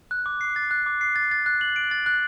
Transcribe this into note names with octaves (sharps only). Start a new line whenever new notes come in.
F#6
D6
C7
A6
F#6
D6
C7
A6
A6
F#6
F#7
D7
A6
F#6